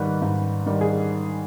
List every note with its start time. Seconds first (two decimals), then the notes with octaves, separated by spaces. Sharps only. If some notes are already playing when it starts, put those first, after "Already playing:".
Already playing: G#2 D#3 G3 B4
0.22 G#2
0.66 D#3 G3
0.81 G#4